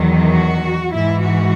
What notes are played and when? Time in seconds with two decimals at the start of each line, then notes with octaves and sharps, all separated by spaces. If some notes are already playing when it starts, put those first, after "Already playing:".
Already playing: E2 D#3 F#3
0.31 F#4
0.92 G#2 E3 E4
1.23 F#4